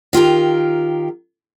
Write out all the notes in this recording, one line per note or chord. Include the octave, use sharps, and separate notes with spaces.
D#3 F4 G4 A#4